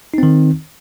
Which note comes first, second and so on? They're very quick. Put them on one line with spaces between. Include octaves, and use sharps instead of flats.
D#4 C4 D#3